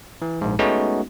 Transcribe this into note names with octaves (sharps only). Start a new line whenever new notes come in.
E3
A#1 G#2
G#3 A3 B3 C#4 D#4 F#4